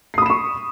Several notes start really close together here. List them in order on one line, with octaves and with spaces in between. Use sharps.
C7 D#6 B5 E7 C#6